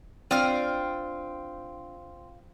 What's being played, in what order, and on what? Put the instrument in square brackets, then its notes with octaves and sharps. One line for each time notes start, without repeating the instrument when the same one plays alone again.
[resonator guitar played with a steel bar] C4 [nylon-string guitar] D4 D5 [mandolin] F4 F6